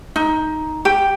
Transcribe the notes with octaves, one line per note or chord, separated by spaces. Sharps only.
D#4
G4